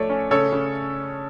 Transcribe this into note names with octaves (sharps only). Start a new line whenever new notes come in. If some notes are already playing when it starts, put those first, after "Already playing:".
Already playing: F3 A3 A4 C#5 D5
C#4
C#3 A4 C#5
C#3